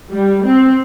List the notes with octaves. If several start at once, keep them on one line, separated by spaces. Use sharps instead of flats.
G3
C4